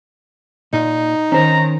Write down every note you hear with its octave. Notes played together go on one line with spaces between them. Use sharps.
A#2 D#4
D#3 C#4 C5 A#5